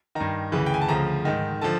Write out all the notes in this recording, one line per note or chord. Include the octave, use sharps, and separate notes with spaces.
G2 D#3 A#5
D2 C#3 E3
G5
G#5
A5
D2 C#3 F3 A#5
G#2 D#3
D3 F3 A5